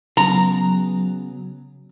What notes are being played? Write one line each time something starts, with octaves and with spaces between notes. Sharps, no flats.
C#3 F#3 B3 A#5